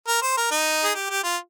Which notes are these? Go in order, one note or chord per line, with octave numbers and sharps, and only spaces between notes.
A#4
C5
A#4
D#4
G#4
G4
G4
F4